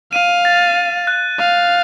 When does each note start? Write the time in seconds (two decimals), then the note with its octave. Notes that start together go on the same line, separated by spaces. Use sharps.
0.13 F5 D#7
0.45 A6
0.75 A6
1.07 F#6
1.39 F5 F#6